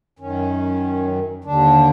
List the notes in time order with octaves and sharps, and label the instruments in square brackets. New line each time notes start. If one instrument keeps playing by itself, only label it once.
[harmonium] F#2 D#3 C#4
D#2 D3 D4